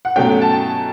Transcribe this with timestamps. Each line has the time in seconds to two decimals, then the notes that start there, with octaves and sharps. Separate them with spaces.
0.05 F#5
0.16 B2 F#3 A3 C#4 G5
0.42 A5